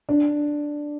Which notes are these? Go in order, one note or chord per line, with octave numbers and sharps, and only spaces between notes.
D4